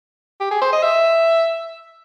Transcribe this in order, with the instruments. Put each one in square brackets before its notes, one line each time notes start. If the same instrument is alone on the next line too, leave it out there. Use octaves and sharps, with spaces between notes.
[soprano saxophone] G4
G#4
C5
D#5
E5